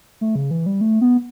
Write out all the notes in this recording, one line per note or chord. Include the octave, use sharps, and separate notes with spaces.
A3
C#3
E3
G3
A3
B3